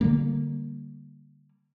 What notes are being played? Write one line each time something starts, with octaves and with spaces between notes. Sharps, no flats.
D3 G3 A#3